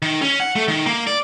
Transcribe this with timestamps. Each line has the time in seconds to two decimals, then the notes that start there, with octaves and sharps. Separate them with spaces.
0.02 D#3
0.22 C#4
0.40 F#5
0.56 A3
0.68 D#3
0.86 A#3
1.07 D5